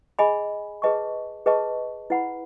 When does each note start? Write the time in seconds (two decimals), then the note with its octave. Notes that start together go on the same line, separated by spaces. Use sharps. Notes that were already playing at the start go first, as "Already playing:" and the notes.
0.19 G#4 D#5 G#5 B5
0.82 G#4 B4 D#5 A5 C#6
1.46 G#4 B4 D#5 A5 C#6
2.10 E4 B4 F#5 B5